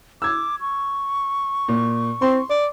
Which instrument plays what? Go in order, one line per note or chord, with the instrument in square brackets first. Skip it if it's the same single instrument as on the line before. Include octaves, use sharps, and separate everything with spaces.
[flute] D6 [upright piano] E6 G#6
[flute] C#6
[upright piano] A#2
[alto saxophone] C4 [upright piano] C6
[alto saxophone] D5